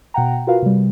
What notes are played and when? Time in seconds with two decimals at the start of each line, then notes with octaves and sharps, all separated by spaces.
0.14 B2 F#5 G5 A#5
0.47 F4 F#4 A#4 B4 F5
0.62 C3 G3